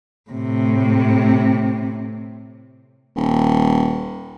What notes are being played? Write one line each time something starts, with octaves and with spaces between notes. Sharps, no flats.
A2 C3
D#1